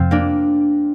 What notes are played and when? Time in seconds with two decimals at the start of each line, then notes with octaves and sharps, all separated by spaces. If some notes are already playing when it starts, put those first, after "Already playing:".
Already playing: F2 C3 F3 C4 F4
0.11 A#3 D4